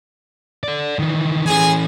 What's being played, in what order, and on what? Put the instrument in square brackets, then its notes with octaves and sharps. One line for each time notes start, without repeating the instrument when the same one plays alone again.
[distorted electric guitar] A4 D5
D#3 E3
[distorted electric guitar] E3 C#4 [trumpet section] G#4 G#5